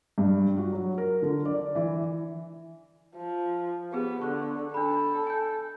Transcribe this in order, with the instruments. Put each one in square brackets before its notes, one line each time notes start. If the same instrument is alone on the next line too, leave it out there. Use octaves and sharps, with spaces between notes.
[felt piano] G2
F#4
F#3
A#4
D3
D5
E3
[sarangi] F3
[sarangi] B3 [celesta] G4 G#4 B4
[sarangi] D3 [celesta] C#6 F#6
[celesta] D4 B5 [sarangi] A4
[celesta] G#5 G6